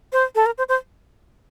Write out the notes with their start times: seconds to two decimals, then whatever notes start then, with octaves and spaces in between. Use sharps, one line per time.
0.13 C5
0.35 A4
0.46 A#4
0.58 C5
0.69 C5